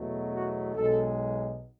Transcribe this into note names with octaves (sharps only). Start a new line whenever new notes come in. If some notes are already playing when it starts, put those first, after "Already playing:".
Already playing: E2 B2 F#3 A3
F#4
B1 B2 G#3 A4